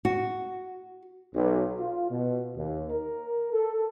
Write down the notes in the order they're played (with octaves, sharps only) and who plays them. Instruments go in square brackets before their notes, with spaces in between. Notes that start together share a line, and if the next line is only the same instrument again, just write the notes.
[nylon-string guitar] F#4
[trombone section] B1
F4
B2
D#2
A#4
A4